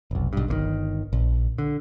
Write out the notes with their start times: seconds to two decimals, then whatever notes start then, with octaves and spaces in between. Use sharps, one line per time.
0.11 F1 B1
0.33 B1 G2
0.48 G1 C3 D#3
1.13 A#1
1.58 D3